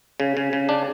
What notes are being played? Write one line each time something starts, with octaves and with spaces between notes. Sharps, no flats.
C#3
C#3
C#3
D4